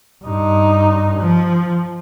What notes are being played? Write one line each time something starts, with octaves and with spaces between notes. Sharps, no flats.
G2 D#4
F3